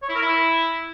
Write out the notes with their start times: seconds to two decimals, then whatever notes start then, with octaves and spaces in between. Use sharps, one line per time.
0.02 C#5
0.09 E4
0.15 A#4
0.22 E4